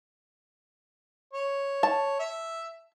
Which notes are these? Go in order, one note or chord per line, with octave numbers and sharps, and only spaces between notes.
C#5
A5
E5